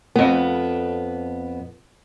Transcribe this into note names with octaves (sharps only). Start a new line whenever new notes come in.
F2 B3